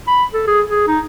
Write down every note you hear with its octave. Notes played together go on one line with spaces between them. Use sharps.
B5
A4
G#4
G#4
D#4